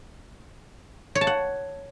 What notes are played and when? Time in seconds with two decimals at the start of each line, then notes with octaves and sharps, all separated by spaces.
1.15 C#5
1.21 A5
1.27 F#5